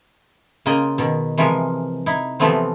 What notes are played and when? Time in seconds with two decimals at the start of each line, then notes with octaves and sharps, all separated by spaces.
0.66 C#3 A#3 F4 D#5 G5
0.98 B2 D#3
1.38 C3 E3 F3 G#3 A#4
2.06 D#4 E4
2.40 C3 E3 F3 A3 B3 C4